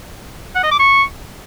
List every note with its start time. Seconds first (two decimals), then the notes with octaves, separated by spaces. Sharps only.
0.55 F#5
0.63 D#5
0.71 D6
0.79 C#6